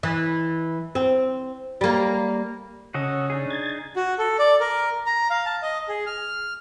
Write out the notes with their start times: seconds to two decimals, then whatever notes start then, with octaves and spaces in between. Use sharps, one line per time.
0.03 E3
0.95 C4
1.81 G3 A#3
2.94 C#3 C#4 F#4 A4 D#5
3.30 D4 D#4 G#4
3.50 G#6 A6
3.96 F#4
4.18 A4
4.39 D5
4.60 A#4
5.06 A#5
5.30 F5
5.46 A5
5.62 D#5
5.88 G#4
6.06 F6